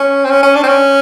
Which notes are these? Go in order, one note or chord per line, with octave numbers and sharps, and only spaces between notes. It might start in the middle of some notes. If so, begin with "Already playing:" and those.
Already playing: C#4
C4
C#4
C#4
D4
C4
C#4